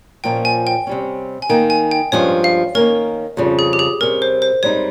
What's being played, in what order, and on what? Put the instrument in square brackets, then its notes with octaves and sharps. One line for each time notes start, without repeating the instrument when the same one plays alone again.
[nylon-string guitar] A#2 F3 A#3 C#4 [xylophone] G5
[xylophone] G#5
G5
[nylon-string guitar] C3 G3 C#4
[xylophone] G#5
[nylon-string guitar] D#3 A#3 D#4 [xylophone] G5
[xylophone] G#5
G5
[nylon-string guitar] G2 F3 G#3 C#4 [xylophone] C#5
[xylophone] F5
[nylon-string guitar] D#3 A#3 C#4 [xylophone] A#4
[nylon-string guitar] F2 C#3 G3
[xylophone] G#4
G4
G#4
[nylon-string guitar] C3 G3 C#4 [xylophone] A#4
[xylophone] C5
C5
[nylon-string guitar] G#2 G3 C4 D#4 [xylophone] C#5